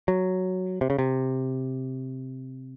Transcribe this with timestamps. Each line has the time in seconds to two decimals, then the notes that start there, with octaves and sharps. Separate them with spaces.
0.08 F#3
0.81 C3
0.90 C#3
0.98 C3